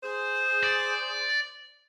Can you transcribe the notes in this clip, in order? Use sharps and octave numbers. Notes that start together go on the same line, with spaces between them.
G#4 C5
D5